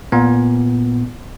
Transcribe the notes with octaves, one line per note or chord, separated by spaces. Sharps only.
A#2 B3